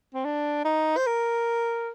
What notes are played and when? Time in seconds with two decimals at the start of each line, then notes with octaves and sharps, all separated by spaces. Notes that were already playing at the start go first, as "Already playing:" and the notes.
0.14 C4
0.25 D4
0.64 D#4
0.97 C5
1.06 A#4